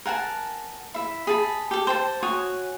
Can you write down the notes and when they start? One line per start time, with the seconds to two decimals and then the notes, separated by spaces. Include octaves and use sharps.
0.06 A#4 F#5 G#5 A5
0.94 E4 E5
1.27 G#4 A5 B5
1.71 G4 A4
1.87 C5 G5 A5
2.23 F#4 C#5 G#5 D#6